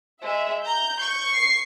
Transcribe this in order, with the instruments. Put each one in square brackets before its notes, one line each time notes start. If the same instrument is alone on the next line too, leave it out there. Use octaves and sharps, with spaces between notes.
[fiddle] G#3 [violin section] E5
[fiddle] A#5 [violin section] G6
[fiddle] C#6
[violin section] C7